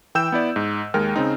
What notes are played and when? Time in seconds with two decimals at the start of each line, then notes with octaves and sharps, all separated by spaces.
0.15 E3 G5 E6 G6 E7
0.32 B3 E4 D5
0.56 G#2
0.94 D#2 G#3 A#4 G5 F6
1.16 C#3 C4 D#4